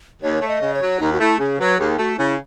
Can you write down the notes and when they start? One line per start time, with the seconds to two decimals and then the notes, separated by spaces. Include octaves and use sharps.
0.22 D#2 C#5
0.41 A3
0.48 D#5
0.60 C#3
0.74 C#5
0.81 F#3
1.00 D#2 D#4
1.13 F#4
1.19 A3 E4
1.39 C#3 G#4
1.59 F#3 B4
1.78 D#2 G#4
1.98 A3 F#4
2.18 C#3 E4